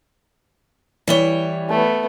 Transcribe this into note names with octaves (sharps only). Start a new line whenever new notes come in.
E3 G3 E4 C#5 G7
A3 B3